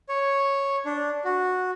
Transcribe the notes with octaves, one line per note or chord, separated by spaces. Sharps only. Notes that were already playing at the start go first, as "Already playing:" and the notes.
C#5
D4
F#4